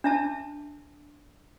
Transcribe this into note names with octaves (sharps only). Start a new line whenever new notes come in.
D4 E5 A5